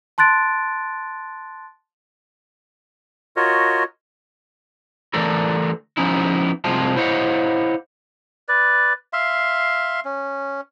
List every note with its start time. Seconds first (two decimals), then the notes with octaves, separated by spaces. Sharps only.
0.18 A5 C6 F#6 A6 D7
3.36 F4 F#4 A#4 C#5 D#5
5.14 D3 E3 A3 D4 A4 A#4
5.97 F3 B3 C#4 D#4 E4
6.64 C2 C3 F3 G#3 F4 A5
6.96 E4 C5 C#5 D#5 F5 F#5
8.49 B4 D5
9.13 E5 F5 C6
10.05 C#4